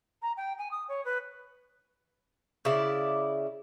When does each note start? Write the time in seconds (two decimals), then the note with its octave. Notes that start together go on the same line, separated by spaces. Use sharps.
0.22 A#5
0.36 G5
0.58 G#5
0.71 D#6
0.88 C#5
1.05 B4
2.65 C#3 E4 D5